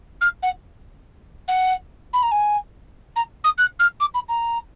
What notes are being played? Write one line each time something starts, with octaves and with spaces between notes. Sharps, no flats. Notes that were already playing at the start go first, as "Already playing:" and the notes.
F6
F#5
F#5
B5
A#5
G#5
A#5
D#6
F#6
F6
D6
B5
A#5